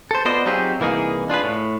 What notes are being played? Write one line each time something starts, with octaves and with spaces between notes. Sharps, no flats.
A4 C5
B3 F4 F#4 C5 D5 D#5
F#3 C4 D#4 F4 G4 G#4
C2 E3 A#3 D#4 G#4
D4 F4 G#4 B4
A2